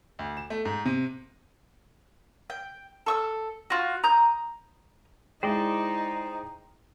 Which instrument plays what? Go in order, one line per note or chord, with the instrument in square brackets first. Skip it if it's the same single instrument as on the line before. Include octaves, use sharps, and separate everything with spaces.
[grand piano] D2
E7
A3
G#2
C3
[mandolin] G5
A4 C#6 E6
F4 F#4
A#5 D#6 G6
[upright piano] G#3 E4 [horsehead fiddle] D#4 [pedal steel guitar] C5 D5 D#5 [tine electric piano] G5